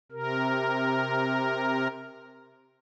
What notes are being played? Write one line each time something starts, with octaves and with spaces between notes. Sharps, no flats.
C3 A#4